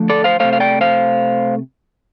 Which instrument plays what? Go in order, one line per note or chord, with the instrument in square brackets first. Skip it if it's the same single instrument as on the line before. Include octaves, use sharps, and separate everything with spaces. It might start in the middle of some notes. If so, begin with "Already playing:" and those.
Already playing: [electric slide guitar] D3 F3 A3
A4 D5
C5 F5
C3 A3 C5 F5
F5
D5 G5
C5 F5